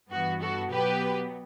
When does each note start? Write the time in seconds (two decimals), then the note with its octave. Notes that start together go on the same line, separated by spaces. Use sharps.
0.10 G2 E3 B3 F#4
0.40 F#4 A4
0.71 B2 F#3 B3 G4 B4